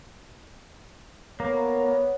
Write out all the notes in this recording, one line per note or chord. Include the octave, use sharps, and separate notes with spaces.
A#3 B3 C#5